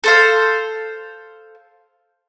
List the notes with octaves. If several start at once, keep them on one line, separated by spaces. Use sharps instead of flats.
A4 C5 F5